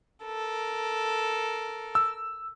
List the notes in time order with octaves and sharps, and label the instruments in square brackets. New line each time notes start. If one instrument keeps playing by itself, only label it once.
[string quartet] A4 A#4
[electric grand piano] E6